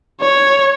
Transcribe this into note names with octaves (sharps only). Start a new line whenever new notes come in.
C#5